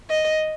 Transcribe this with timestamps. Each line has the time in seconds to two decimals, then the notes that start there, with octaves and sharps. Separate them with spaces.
0.10 D#5